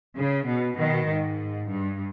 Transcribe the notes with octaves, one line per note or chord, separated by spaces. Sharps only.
C#3
B2
B2 D#3
G#2
G2